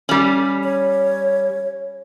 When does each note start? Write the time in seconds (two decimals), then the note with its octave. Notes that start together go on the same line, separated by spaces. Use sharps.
0.09 G3 C#4
0.64 C#5